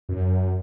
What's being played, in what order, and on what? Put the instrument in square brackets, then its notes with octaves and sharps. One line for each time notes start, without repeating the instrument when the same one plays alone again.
[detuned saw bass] F#2